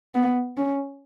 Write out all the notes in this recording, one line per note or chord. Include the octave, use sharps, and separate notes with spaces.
B3
C#4